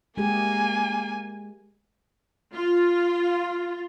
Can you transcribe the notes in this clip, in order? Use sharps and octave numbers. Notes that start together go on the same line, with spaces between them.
G#3 A#3 G4 G#4 G#5
F4